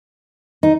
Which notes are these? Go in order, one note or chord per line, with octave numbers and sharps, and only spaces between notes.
D#4